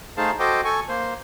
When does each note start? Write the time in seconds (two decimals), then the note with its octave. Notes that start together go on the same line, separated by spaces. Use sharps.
0.17 A3 D#4 G#4 C5 F5 A5
0.39 F#4 A4 C5 D#5 G5 D6
0.65 A4 G#5 C#6
0.89 A#3 C5